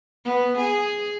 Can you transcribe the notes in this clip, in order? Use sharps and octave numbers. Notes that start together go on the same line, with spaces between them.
B3
G#4